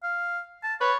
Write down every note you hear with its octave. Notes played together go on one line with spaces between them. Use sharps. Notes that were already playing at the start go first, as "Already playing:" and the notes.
F5
A5
B4 C#5